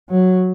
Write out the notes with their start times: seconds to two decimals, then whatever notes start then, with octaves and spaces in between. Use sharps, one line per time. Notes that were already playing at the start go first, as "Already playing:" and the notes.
0.10 F#3